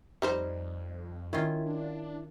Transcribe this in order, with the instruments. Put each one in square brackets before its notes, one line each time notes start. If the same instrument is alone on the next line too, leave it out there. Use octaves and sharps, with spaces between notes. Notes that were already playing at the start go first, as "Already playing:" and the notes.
[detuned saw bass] F2 [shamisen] G3 D#4 C5
[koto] D#3 C#4 F4 [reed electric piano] E4
[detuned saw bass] D4